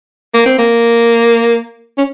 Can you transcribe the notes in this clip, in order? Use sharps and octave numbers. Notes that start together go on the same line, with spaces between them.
A#3
C4
A#3
C#4